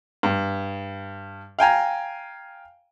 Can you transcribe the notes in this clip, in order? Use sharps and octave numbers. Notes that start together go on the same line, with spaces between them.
G2
F5 G5 G#5 A#5